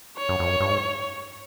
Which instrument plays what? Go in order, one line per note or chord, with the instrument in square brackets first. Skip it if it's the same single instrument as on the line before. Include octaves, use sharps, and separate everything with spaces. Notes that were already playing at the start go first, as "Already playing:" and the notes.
[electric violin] C#5
[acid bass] F#2
F2
F#2
G2
G#2